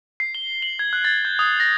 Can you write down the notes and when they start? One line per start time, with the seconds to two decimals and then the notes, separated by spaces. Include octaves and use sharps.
0.20 C7
0.35 G7
0.62 F#7
0.79 G#6
0.93 F#6
1.05 A6
1.25 G6
1.39 D#6
1.60 A#6